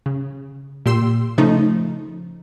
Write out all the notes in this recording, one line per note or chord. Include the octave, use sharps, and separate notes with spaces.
C#3
A#2 G4 C6 E6
C#3 F3 A3 D#4